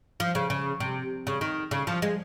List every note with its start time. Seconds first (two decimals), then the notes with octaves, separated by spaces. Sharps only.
0.20 F3
0.35 C#3
0.50 C#3
0.80 C3
1.27 C#3
1.41 D#3
1.71 C#3
1.87 F3
2.02 G#3